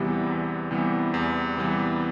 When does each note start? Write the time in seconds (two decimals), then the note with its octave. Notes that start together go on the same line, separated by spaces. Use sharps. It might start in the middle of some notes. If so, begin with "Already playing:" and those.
Already playing: E2 C3 E3 G3 B3 G4
0.26 E2
0.71 C3 E3 G3 B3
1.14 E2
1.58 C3 E3 G3 B3